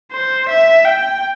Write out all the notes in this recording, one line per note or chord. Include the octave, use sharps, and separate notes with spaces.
C5
E5
G5